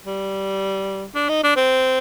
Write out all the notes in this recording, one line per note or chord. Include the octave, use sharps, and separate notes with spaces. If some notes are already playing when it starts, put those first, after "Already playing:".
G3
D4
D#4
D4
C4